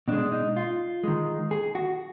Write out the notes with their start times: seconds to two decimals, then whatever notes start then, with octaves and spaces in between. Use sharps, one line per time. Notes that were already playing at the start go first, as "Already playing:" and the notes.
0.08 B2 G#3 D4
0.32 D#4
0.56 F4
1.04 D#3 G#3
1.51 G#4
1.75 F#4